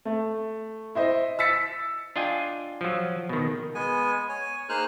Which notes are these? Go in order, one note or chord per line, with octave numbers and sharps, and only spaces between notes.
A3
E4 C5 D#5
E6 A6 B6 C#7
D4 F4 D#5 G5 G#5
F3 F#3
B2 D#3
G#3 B3 G#5
C#5 G#5
A#3 D#4 G#4 C5 F6 F#6